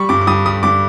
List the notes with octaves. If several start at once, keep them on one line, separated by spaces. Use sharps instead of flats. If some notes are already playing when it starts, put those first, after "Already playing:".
Already playing: G3 C#6
G2 D6
D6
G2 D#6
G3 D#6
G2 D6